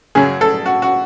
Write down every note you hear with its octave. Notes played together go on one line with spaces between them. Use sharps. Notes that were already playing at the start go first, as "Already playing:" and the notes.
F#2 C#3 F#3 G#4
A4
F#4
F#4